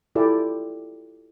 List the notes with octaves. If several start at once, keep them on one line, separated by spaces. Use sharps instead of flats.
E4 F4 G4 A4 D5